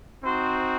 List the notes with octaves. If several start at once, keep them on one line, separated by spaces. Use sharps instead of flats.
C4 D#4 F#4 C5